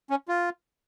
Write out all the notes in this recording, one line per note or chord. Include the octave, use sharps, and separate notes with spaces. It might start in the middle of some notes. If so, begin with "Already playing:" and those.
C#4
F4